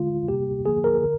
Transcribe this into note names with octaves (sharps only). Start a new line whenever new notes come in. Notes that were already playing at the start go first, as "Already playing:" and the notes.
Already playing: D3 G#3 F4
C3 G3 A#3 G4
D3 F3 A#3 G#4
A#4
D3